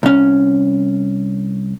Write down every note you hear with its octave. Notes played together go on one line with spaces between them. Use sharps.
C2 C#4